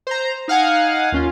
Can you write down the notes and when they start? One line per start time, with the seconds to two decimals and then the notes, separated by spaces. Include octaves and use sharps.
0.07 C5 A#5
0.48 D#4 F5 F#5 G#5
1.12 D#2 C#4 F4